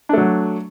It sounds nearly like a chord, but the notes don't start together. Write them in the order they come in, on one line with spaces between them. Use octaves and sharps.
D4 A3 F#3